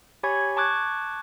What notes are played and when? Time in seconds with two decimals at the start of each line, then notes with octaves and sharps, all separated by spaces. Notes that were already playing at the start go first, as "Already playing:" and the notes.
0.23 G4 C#5 G#5 B5 C#6 G#6
0.57 A5 C#6 D6 F#6 G#6